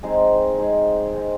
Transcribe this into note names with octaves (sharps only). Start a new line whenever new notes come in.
G#3 C4 D#4 G#4
G#3 C4 D#4 G#4
D#3 G#3 C4